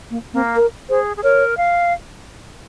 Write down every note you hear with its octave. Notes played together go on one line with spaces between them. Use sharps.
A#3
A#3 C4
A#4
G#4 C5
G#4
A#4 C#5
F5